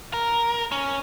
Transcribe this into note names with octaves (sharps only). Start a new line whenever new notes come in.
A#4
C#4